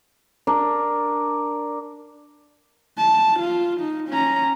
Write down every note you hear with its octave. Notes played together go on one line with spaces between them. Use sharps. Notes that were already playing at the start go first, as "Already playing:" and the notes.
D4 A#4
A5
F4
D#4
C#4 A#5